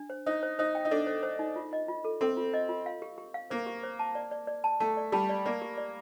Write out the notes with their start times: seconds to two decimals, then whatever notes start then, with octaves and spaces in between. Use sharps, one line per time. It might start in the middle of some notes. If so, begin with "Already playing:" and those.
Already playing: D4
0.10 C5
0.26 D#4 C5
0.43 C5
0.59 D#4 C5
0.75 G5
0.85 D#4
0.91 D4 A4
1.07 C5
1.23 C5
1.39 D#4
1.56 F4
1.73 D#5
1.88 F4
2.05 A4
2.21 C4 A4
2.37 F4
2.54 D#5
2.69 F4
2.86 F5
3.02 G4
3.18 G4
3.34 F5
3.50 A#3 C5
3.67 G4
3.83 C5
3.99 A5
4.15 D5
4.31 D5
4.47 D5
4.64 A5
4.80 A3 A5
4.97 D5
5.12 G3 A5
5.29 D5
5.46 A#3 D5
5.62 G4
5.78 D5